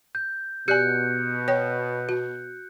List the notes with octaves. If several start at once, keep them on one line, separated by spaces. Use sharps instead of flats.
G6
B2 G4 D5 G#5 F#6 G6 C#7
C#5 G5
F#4